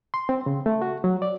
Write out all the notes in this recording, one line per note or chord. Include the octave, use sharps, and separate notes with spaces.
C6
C4
C#3
A3
F#4
F#3
D5